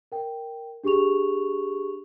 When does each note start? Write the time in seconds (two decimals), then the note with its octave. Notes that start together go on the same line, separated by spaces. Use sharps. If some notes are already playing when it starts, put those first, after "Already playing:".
0.12 A#4 G5
0.83 D4 G4 G#4 C#6 F7